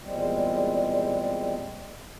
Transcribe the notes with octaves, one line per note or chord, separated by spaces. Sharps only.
E2 A#2 G3 G#3 C4